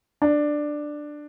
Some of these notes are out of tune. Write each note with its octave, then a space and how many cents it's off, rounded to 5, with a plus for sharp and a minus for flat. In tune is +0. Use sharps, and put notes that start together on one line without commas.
D4 +10